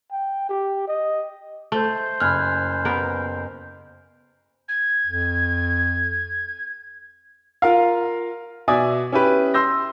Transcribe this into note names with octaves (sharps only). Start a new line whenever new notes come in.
G5
G4
D#5
A3 C5
F#1 G#5 B5 F6 F#6 G#6
B3 G4 A#4
G#6
F2
F4 A#4 F5
B2 D5 E5 G#5 D#6
C#4 E4 G4 B4
C6 E6 G6 A#6